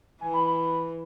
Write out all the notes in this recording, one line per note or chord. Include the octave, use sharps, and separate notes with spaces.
E3 G#5
B5
B5